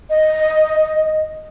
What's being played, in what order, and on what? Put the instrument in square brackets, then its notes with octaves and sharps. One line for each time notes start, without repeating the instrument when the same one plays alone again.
[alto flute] D#5